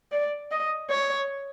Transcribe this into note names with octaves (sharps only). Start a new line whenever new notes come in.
D5
D#5
C#5